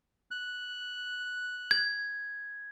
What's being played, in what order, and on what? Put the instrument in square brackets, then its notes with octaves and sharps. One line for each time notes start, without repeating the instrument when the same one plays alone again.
[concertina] F#6
[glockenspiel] G#6